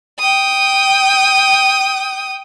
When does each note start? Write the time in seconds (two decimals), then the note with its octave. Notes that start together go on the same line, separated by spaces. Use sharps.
0.19 G5 D#6